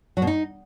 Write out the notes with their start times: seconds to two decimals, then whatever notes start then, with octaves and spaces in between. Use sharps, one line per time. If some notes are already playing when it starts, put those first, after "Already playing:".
0.17 F#3
0.22 B2
0.27 D#4